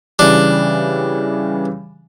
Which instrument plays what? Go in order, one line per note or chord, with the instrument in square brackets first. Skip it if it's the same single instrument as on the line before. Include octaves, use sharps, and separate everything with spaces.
[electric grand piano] C#3 E3 G3 [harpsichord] D4